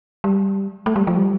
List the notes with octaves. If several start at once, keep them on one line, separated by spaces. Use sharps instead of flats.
G3
A3
G3
F3
G3